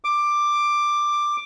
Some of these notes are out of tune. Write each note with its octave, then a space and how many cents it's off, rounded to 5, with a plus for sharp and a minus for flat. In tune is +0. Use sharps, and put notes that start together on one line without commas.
D6 +10